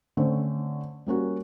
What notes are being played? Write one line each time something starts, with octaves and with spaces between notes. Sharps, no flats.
D3 A3 C4 C#4
G3 A#3 C#4 F#4